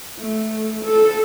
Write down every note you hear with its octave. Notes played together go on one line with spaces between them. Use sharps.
A3
A4